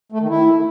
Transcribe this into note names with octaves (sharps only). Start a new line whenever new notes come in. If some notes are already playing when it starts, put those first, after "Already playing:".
A3
D#3
E4